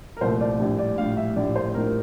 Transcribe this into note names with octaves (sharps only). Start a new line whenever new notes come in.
A#4
C2 A#2 F3 A3 C5
D5
A#1 A2 G3
D5
A#1 A2 G3 F5
E5
A#1 A2 G3 D5
C5
A#1 A2 G3 A#4